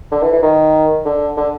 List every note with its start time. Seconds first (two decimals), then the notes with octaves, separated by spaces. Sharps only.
0.12 D3
0.22 E3
0.33 E3
0.43 D#3
1.05 D3
1.37 D3